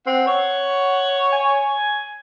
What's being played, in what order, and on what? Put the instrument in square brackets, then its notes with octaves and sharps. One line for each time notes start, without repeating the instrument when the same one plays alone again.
[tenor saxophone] C4 [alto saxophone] F#5
[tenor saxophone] C#5
[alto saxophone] G#5